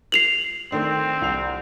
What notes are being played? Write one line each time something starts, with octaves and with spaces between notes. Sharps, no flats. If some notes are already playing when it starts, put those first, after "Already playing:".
C7 F7 F#7
D#3 A3 C4 D4
C2 F7